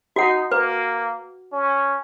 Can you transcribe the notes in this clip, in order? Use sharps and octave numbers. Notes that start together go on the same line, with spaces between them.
D#4 F#4 F#5
A#3 B4
C#4